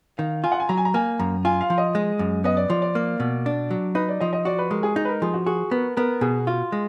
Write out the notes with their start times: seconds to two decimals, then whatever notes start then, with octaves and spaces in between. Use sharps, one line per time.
0.18 D#3 F5
0.44 F4 G#5
0.52 F#5
0.60 G#5
0.69 F#3 A#5
0.77 G#5
0.85 A#5
0.94 A#3 G#5
1.19 F#2 A#5
1.45 F4 G#5
1.61 F5
1.70 F3
1.78 D#5
1.95 G#3
2.19 F#2
2.44 B3 D#5
2.57 D5
2.70 F3 D5
2.82 D5
2.95 A#3
3.20 B2
3.46 D4
3.71 F#3
3.95 D#4 B4
4.08 D5
4.20 F3 D#5
4.33 D#5
4.45 F#4 D5
4.59 B4
4.71 G#3 A#4
4.83 G#4
4.96 D#4 G#4
5.05 B4
5.09 A#4
5.22 F3 G#4
5.34 F#4
5.46 F#4 G#4
5.71 B3 A#4
5.97 B3 A#4
6.21 B2 G#4
6.47 F4 F#4
6.72 G#3